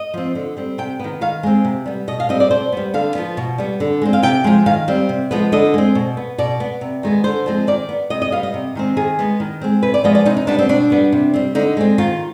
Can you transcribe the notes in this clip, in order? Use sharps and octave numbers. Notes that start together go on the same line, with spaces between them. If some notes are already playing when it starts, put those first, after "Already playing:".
Already playing: D#5
F3 C4
D3
G3 C4
C3 G5
D#3 B3
D#3 F5
G#3 C4
C3
G3 B3
B2 D#5
F5
G3 C4 D#5
D5
B2 C5
G3 B3
D3 F5
F3 B3
B2
G3 B3
D3
G#3 C4
F5
C3 G5
F3 G#3
D#3 F5
G3 C4
C3
F3 G#3 B3
D3 D#5
G#3 C4
B2
B3
B2 D5
B3
C3
D#3 G#3 B3
D3 C5
F3 G#3 C4
D#3 D5
B3
C3 D#5
D#5
G3 B3 F5
D#5
C3
D#3 G#3 C4
D#3 G#4
G#3 B3
D#3
G#3 C4
C3 B4
D5
F3 G#3 B3 D#5
D5
C3 D#4
D#4
G3 B3 D4
C4
B2 D4
G3 B3
C3
G3 C4
D3 D#4
G#3 C4
D#3 F4